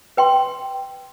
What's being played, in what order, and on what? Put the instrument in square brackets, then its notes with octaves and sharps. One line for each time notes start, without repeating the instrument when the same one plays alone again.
[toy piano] B4 G5 C6